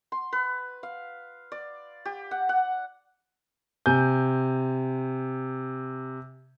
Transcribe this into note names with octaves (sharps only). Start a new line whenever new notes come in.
C6
B4
F5
D5
G4
F#5
F#5
C3 G#5 G6